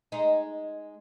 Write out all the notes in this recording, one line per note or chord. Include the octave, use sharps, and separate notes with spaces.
G#3 D#4